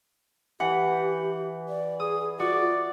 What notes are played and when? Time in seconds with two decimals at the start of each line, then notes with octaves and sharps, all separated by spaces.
0.60 E3 G4 F#5
1.68 D5
2.00 G#4 D#6
2.40 F4 F#4 D5